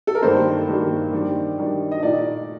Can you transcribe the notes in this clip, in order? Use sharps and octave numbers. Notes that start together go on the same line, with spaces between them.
A4
A#4
G2 D#3 A#3 C5
G2 D#3 A#3
D#3 G3 D4
D#3 G3 D4
D#5
A#2 A3 D#4 D5